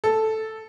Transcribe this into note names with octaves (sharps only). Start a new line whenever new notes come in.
A4